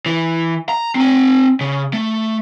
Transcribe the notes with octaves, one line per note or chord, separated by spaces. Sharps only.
E3
A#5
C4 G#5
C#3
A3